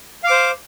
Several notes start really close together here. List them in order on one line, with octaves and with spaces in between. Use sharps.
F5 D6 C5